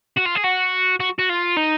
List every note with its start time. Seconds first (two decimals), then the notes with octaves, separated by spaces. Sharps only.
0.17 F#4
0.25 F4
0.35 G#4
0.44 F#4
1.00 F#4
1.19 F#4
1.29 F4
1.56 D#4